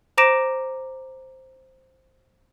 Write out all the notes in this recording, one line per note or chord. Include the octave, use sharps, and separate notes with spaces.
C5 A#5 D6 A#6 D7 E7